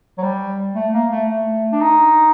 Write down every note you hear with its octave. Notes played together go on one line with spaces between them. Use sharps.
F#3
G3
A3
A#3
A3
A3
D4
D#4